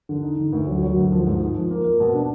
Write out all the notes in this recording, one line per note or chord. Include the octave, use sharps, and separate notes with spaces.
D3
D#4
D3
D2
F#3
F#3
D2
F3
G#2
G#3
F3
A#3
A#3
B2
D4